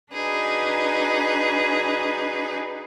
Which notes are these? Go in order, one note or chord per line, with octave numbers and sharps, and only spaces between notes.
D4 D#4 F#4 G#4 B4